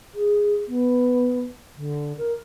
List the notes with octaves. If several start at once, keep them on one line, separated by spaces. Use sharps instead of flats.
G#4
B3
D3
A#4